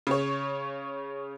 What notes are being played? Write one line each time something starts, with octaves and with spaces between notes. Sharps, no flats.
C#3 C#5